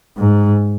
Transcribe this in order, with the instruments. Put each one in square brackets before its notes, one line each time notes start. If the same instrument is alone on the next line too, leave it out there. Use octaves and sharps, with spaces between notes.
[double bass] G#2